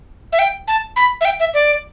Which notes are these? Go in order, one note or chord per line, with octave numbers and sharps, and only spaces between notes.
E5
G5
A5
B5
E5
G5
E5
D5